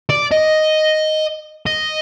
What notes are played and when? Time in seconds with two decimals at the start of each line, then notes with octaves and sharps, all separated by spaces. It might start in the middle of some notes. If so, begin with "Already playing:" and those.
0.10 D5
0.31 D#5
1.66 D#5